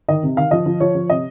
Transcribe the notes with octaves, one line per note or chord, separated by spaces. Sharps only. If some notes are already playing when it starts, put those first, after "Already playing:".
D#3 D#5
C3
D#3 F5
F3 D#5
F3
F3 C#5
F3
C3 D#5